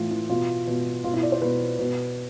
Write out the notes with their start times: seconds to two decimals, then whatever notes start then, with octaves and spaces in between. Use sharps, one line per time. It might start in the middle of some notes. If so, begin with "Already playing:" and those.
Already playing: A2 E3 F4
0.11 E3
0.29 B2 F4
0.67 B2
1.04 B2 F4
1.14 E4
1.23 D5
1.32 C5
1.42 B2 B4
1.79 B2